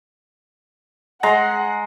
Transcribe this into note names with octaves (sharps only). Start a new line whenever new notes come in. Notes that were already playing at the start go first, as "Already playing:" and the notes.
G#3 F#5 A#5 C6